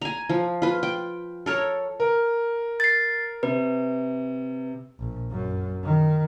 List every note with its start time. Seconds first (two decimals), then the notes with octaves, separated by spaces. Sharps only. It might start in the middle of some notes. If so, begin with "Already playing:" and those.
0.02 G#5 A#5
0.29 F3
0.62 F4 B4
0.83 G5
1.46 A4 A#4 C#5
2.00 A#4
2.80 A6 C7
3.43 C3 B4
4.99 A#1
5.31 F#2
5.84 D#3